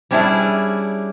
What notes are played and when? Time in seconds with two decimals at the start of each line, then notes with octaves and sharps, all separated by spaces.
0.11 G3 C#4 D4 E4 G#4